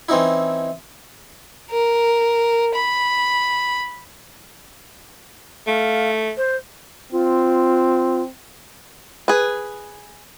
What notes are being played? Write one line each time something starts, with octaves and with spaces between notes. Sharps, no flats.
E3 C4 C#4 D#4 E4
A#4
B5
A3 F5
C5
C4 F4
G#4 B4